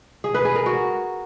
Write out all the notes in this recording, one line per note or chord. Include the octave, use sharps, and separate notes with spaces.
G#4
B4
G#4
A#4
F#4